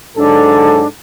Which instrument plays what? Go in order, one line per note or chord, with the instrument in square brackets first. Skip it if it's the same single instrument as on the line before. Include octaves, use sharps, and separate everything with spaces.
[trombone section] G#2 F#3 A4 [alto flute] D4